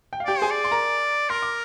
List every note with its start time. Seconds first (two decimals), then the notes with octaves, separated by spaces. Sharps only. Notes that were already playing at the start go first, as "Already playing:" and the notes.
0.13 G5
0.20 F5
0.25 G4 D5 G5
0.38 G#4 C5 G#5
0.51 D5
0.64 C6
0.71 A#4 A#5
1.29 A#4 C6
1.42 D6